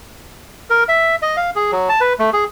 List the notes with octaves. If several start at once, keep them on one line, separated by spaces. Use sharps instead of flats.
A#4
E5
D#5
F5
G#4
F#3
A5
B4
A3
G#4